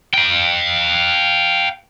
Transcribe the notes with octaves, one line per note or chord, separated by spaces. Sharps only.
F5 G5